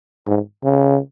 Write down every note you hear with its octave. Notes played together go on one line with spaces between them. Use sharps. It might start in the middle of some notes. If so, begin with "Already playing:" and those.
G#2
C#3